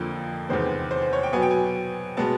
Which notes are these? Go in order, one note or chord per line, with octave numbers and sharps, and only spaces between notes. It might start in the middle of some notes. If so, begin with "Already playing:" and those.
Already playing: F2 D3 F3 A#3 A4
E2 C3 D#3 G#3 B3 C5
C5
C5
C#5
G5
B2 F#3 B3 G#5
G5
G#5
B2 G#3 B3 A5